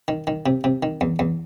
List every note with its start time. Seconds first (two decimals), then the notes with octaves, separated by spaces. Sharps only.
0.08 D#3
0.27 D#3
0.46 C3
0.64 C3
0.83 D#3
1.01 E2
1.19 E2